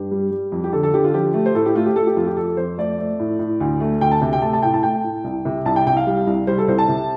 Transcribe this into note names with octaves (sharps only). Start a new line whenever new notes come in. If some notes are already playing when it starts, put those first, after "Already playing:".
Already playing: G2 G4
G3
G3
F2
G4
D3 A4
A4
D3 G4
F4
F3 G4
A3
C5
A2 A4
G4
A3 F4
G4
A3 A4
G4
F2 F4
G4
F2 A4
F2 C5
A3 D5
A3
A2
A2
D2
A3
D2 G5
A5
C3
G5
A3 A5
A5
A2 G5
A5
A3 G5
A2
C2
C3
C2 A5
G5
C2 G5
F5
G3
C2
G3 C5
A4
C2 C5
A5
C3